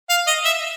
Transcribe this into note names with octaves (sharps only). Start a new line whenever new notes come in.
F5
D#5
E5